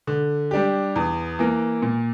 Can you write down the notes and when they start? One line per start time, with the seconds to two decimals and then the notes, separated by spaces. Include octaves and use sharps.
0.07 D3
0.51 G3 D4 G4
0.96 E2
1.39 E3 A#3
1.82 A#2